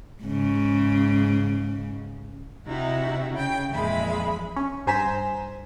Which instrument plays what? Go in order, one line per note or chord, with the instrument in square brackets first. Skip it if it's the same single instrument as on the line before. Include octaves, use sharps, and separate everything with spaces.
[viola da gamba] G#2 C#3
[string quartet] C3 D#4 E4 F#4 E5
C#3 G5
F2 A#2 E3 G#3 E5 B5
[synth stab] C#4
G2 C5 G#5 A#5 B6 E7